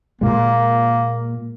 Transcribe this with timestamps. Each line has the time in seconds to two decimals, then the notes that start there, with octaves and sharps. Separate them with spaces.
0.21 A#2 G#3 A#3